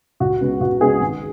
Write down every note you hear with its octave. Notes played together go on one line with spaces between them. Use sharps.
C#2 F#4
C#3 G#3 B3
C#2 F#4
C#3 G#3 B3 G#4
G#1